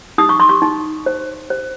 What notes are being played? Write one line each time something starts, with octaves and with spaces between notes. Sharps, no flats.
D#4 D#6
C#6
C6
C#6
D#4
C5
C5